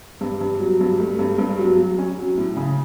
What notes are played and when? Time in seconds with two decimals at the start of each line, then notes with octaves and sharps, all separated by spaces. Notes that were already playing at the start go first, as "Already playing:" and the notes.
0.21 G2
0.41 G2
0.60 F#3
0.81 G2
1.00 A3
1.19 G2
1.38 G2
1.59 F#3
1.78 F#3
1.98 C#4
2.18 F#3
2.38 A2
2.57 C#3